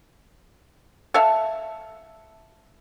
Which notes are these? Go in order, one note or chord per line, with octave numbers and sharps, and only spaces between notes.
A4 E5 F5